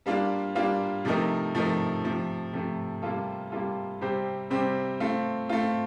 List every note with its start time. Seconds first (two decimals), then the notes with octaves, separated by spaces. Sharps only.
0.06 G3 A#3 D4 F4
0.55 G3 A#3 D4 F4
1.05 C3 F3 A3 D#4 A#4
1.54 C3 F3 A3 D#4 A#4
2.04 C3 F3 A3
2.53 C3 F3 A3
3.02 C3 G3 A#3 F4 A4
3.51 C3 G3 A#3 F4 A4
4.01 C3 G3 C4 G4 C5
4.50 C3 G3 C4 G4 C5
5.00 A3 C4 F4
5.49 A3 C4 F4